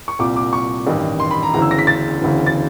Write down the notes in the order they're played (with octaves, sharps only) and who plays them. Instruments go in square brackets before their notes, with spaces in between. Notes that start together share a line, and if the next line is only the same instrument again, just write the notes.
[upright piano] C#6
C2 A#2 D6
D6
C#6
A1 G2 D#3
C6
B5
A#5
E1 D2 C#3 E3 A#5
E6
A#6
B6
A6
E1 D2 C#3 E3
A6